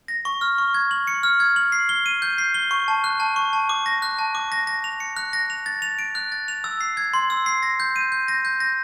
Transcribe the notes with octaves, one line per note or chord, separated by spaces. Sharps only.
A#6
C#6
F6
C#6
G#6
F#7
C#7
F6
G#6
F#7
C7
G7
D#7
G6
C7
G7
C#6
A5
F#6
A5
C#6
A5
D6
A#6
F#6
A5
D6
A#6
A#6
F7
C#7
F#6
A#6
F7
A6
F7
D7
F#6
A6
F7
E6
C7
G#6
C6
E6
C7
A#6
G6
D#7
G6
A#6
G6
A#6